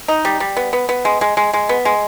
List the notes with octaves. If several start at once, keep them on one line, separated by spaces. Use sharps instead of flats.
D#4
G3
G3
B3
B3
B3
G#3
G#3
G#3
G#3
B3
G#3